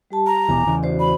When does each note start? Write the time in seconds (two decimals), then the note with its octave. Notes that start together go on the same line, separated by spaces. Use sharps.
0.11 G3 G4 A5
0.26 A#5
0.49 D#1 B2 E3 G#5 D6
0.67 E2 C#3 E3
0.83 F#4 C5 D5
1.00 B5